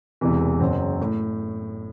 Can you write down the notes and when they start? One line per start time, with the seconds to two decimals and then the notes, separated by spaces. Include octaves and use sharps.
0.21 E1 E2 C3 E3
0.60 F#1 F#2 F#3 C4
1.01 A2